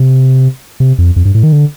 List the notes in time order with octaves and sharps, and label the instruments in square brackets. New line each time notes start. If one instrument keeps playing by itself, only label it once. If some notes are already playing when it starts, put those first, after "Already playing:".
Already playing: [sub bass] C3
C3
F2
F2
G2
A2
D#3
D3